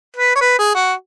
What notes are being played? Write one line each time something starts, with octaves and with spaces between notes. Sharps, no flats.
B4
C#5
B4
G#4
F#4